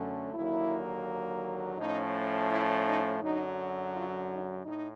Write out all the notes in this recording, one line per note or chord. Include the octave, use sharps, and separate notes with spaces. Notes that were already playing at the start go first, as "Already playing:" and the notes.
Already playing: F#2 D3 F#3 A3 C#4
D#2 D3 F#3 A#3 E4
A2 F3 A3 C#4 D#4
E4
D#4
F#2 D3 F#3 D#4
F4
D#4
A2 D#4